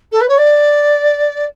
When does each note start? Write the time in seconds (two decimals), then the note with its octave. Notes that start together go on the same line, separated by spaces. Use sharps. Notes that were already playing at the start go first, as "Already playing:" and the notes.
0.12 A4
0.20 B4
0.28 C#5
0.38 D5